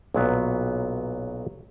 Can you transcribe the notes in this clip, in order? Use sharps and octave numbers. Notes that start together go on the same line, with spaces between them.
B1 A#2 F#3 B3